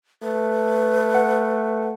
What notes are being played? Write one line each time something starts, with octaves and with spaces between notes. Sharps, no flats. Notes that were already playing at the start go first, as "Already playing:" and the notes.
A3 B4
F#5